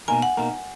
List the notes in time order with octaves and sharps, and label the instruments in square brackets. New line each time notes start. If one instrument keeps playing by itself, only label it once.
[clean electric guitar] B2 A#3 D#4 A#4 [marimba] G#5
[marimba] F#5
[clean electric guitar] B2 A#3 D#4 A#4